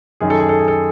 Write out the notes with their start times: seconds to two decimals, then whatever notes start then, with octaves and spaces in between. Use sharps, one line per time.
0.20 F#2 D#3 G#4
0.30 A4
0.40 G#4
0.49 A4
0.59 G#4
0.68 A4